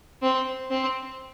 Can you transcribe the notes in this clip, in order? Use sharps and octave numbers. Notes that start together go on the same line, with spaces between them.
C4
C4